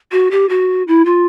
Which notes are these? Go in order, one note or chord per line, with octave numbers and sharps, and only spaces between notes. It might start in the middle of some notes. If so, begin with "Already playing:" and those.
F#4
G4
F#4
E4
F4